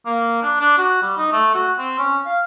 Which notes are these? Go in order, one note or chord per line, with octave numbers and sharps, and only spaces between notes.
A#3
D4
D4
F#4
G3
D#4
A3
F#4
C4
C#4
F5